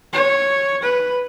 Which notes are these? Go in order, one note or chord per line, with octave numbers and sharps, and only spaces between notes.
C#5
B4